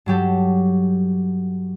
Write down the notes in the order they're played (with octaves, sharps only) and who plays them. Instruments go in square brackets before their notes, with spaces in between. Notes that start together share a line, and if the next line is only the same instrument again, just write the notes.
[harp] G2 F#3 G4 A4